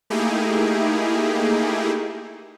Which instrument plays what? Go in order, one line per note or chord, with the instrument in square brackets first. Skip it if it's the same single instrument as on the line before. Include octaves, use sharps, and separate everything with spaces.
[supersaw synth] A3 A#3 D#4 E4 G4 G#4